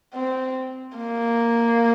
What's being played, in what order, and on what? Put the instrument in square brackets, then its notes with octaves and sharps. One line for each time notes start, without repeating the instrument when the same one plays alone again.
[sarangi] C4
A#3